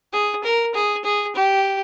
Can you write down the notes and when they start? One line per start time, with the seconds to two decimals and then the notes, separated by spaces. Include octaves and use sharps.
0.13 G#4
0.43 A#4
0.74 G#4
1.04 G#4
1.35 G4